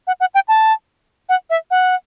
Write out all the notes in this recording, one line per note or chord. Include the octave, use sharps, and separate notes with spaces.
F#5
F#5
G5
A5
F#5
E5
F#5